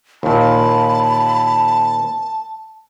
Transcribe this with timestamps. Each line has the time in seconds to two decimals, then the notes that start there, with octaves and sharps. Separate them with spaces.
0.23 D#2 A#2 A5 B5